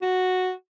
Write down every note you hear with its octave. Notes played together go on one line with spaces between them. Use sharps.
F#4